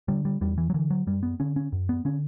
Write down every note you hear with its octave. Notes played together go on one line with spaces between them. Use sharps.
D3 G3
G3
E2 G3
E3
F#3
D3 E3
F#3
F#2 G3
B3
D3 C#4
C#4
F#2
B3
D3 C#4